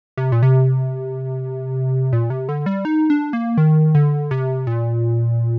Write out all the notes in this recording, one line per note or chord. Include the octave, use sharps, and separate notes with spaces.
C3
A#2
C3
A#2
C3
D3
G3
D#4
D4
A#3
D#3
D3
C3
A#2